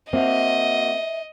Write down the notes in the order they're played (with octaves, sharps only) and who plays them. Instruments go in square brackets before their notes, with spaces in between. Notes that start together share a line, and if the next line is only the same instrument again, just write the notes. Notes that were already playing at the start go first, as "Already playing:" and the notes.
[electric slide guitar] A#3 F#4 [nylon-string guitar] C4 [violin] D#5 [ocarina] E5